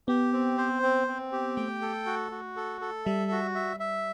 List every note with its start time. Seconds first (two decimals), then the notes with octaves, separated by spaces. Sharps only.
0.08 B3 G4
0.33 C4
0.58 C5
0.82 C4
1.07 C4
1.32 G4
1.56 A3 G5
1.82 A4
2.06 F#4
2.32 F#4
2.56 A4
2.81 A4
3.05 G3 E5
3.31 F#4
3.55 E5
3.80 E5